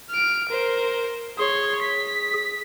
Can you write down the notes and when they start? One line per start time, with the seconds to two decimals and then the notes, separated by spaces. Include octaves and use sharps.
0.10 F6 D7
0.49 A#4 C5
1.38 G#4 C#5 C6
1.82 B6